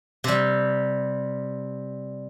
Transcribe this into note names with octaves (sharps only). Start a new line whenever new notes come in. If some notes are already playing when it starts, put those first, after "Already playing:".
C3 G3